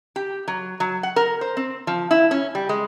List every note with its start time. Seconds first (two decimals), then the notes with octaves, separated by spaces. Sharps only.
0.16 G4
0.48 F#3
0.80 F#3
1.03 F#5
1.16 A#4
1.41 C5
1.57 C4
1.87 F3
2.11 E4
2.31 C#4
2.55 G3
2.69 G#3